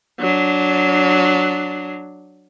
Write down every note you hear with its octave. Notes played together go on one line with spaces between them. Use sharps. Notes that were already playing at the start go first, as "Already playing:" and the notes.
F#3 D4